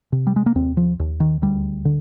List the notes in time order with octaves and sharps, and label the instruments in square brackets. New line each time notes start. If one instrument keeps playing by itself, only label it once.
[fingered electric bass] C3
G3
G#3
A#3
D#2 C4
F3
D#2
D#3
D2 G3
D3